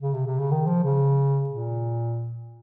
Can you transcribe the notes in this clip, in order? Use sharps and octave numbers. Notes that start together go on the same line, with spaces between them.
C#3
C3
C3
C#3
D#3
F3
C#3
A#2